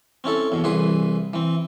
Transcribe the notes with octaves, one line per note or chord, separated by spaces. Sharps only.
C4 C#4 E4 A4
E2 B2
C2 E3 G#4 B4 C6
E3 C4